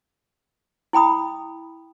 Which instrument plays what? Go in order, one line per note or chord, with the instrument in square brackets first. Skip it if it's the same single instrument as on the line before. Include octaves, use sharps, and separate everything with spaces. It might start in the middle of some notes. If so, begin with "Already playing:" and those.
[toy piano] E4 G5 B5 D#6